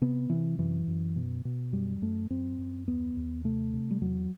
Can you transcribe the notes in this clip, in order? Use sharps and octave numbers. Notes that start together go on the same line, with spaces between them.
C3 B3
C3 E3
F#2 E3
F#2
B2
B2
F#2 G3
F#2 A3
F#2 C4
F#2
D#2 B3
D#2
C3 A3
C3
G3
E2 F#3